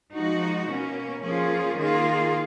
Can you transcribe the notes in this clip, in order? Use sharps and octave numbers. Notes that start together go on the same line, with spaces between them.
F3 G#3 D#4 F#4
B2 A#3 C#4
F3 A#3 C#4 F4 G#4
D#3 A#3 F4 G#4